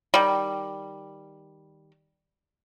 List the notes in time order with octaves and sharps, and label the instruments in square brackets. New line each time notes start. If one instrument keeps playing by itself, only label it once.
[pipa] D#3 G3